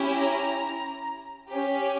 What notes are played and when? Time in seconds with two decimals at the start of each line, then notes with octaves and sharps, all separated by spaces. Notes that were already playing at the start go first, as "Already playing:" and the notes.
Already playing: C#4 E4 G4
0.15 A#5
1.48 C#4 G4